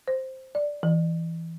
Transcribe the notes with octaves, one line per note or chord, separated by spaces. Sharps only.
C5
D5
E3